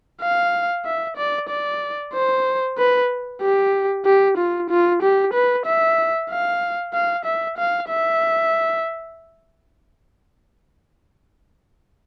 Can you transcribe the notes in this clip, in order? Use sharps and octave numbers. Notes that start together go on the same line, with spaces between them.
F5
E5
D5
D5
C5
B4
G4
G4
F4
F4
G4
B4
E5
F5
F5
E5
F5
E5